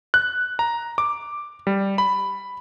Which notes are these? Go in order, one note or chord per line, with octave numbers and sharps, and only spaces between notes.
F#6
A#5
D6
G3
B5